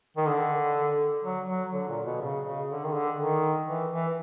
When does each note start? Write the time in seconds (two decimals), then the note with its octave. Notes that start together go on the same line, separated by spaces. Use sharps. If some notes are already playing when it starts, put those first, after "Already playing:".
0.17 D#3
0.27 D3
1.25 F#3
1.49 F#3
1.73 D3
1.89 A#2
2.05 B2
2.22 C#3
2.45 C#3
2.71 D3
2.85 D#3
2.94 D3
3.19 D#3
3.68 E3
3.92 E3